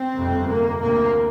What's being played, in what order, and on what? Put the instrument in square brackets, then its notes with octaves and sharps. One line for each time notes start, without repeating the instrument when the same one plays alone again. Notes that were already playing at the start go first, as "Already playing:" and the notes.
Already playing: [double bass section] C4
G1 F2 C3
A#3
D2 C3 A#3